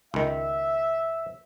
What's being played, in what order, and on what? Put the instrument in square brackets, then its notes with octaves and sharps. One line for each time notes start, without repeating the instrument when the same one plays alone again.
[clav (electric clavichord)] C#2 D#3 [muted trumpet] E5